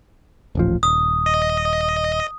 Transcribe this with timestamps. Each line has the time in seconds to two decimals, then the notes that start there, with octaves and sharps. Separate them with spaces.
0.55 D#1 A1 F3
0.83 D#1 D#6
1.26 D#5